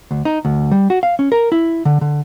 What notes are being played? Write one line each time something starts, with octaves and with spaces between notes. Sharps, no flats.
D2
D#4
D2
G3
F#4
F5
C#4
A#4
E4
D3
D3